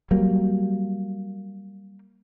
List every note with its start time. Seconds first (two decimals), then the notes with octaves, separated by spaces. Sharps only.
0.11 F#3 G3 A#3